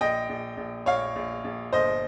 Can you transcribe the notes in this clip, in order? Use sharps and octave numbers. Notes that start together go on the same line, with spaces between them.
A#1 D#5 G5
A#1
A#1
A#1 C#5 F5
A#1
A#1
G1 C5 D#5